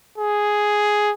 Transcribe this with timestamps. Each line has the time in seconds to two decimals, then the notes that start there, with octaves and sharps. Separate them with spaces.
0.18 G#4